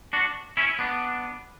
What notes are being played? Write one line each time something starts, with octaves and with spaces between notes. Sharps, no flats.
D4 F#4
C#4 E4
B3 D4